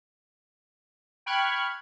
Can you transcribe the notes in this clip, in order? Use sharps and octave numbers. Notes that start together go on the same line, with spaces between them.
G5 B5 C#6 F6 F#6 G#6